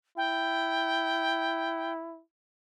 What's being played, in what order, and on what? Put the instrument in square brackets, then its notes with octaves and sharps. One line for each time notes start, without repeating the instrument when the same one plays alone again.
[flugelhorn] E4 [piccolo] G5